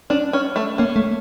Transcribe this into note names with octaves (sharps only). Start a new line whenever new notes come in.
C#4 D4
C#4
A3
A#3 C#4
A3